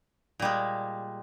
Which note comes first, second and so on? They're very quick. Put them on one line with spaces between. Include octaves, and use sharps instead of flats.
A#2 G3 G#3